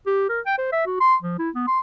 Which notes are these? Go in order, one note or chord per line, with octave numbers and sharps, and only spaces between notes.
G4
A#4
G5
C5
E5
F#4
C6
F3
E4
B3
C6